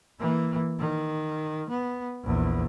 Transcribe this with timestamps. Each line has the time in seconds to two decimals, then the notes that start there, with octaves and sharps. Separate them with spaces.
0.19 E3 A#3
0.79 D#3
1.70 B3
2.23 A#1 E2